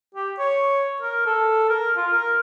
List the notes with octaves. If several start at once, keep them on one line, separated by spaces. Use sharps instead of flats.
G4
C#5
A#4
A4
A#4
F4
A#4